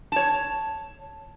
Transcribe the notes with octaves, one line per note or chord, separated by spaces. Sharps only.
C#5 A5